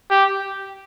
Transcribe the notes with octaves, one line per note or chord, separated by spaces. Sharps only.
G4